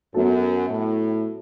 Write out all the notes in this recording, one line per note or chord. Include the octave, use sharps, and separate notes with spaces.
F#2 F#3 B3 F#4 A4
A2